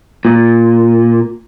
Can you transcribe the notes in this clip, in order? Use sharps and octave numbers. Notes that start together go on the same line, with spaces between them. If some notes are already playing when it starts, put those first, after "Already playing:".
A#2